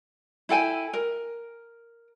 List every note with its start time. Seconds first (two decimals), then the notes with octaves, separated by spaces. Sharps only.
0.49 E4 A4 G5 G#5
0.93 A#4